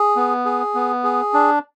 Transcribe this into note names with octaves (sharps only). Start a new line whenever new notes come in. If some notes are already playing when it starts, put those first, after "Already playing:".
Already playing: G#4
B3
G#4
B3
G#4
D4